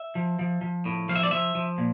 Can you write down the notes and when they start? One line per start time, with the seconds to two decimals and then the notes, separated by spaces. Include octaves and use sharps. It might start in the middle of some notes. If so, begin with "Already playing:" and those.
Already playing: E5
0.15 F3
0.39 F3
0.61 F3
0.85 A2
1.09 F3 F5
1.15 E5
1.23 D5
1.31 F3 E5
1.55 F3
1.78 A#2